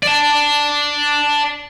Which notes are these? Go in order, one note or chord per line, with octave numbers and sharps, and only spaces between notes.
D5 A5